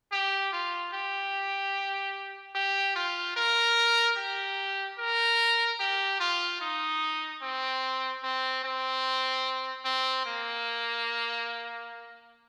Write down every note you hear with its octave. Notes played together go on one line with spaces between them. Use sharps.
G4
F4
G4
G4
F4
A#4
G4
A#4
G4
F4
D#4
C4
C4
C4
C4
A#3